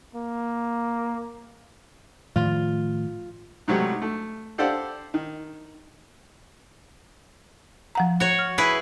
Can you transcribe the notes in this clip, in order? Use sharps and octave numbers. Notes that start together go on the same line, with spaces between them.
A#3
A2 D#3 F3 F4
G#2 C3 F#3 G3 A3
A3
G4 A4 C5 D5 F5 F#5
D#3
F3 F#5 A#5
F#4 C#5
F6
E4 G#4 B4